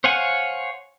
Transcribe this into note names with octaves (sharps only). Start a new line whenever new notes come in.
C5 C#5 F5 F#5 G#5